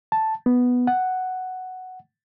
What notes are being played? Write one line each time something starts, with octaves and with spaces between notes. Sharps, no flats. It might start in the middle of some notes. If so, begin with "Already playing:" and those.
A5
B3
F#5